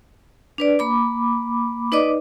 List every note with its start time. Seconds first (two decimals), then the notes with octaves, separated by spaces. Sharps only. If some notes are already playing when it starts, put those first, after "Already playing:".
0.58 D4 B4 D5
0.79 A#3 B5 D6
1.92 D#4 B4 D5 D#5 D6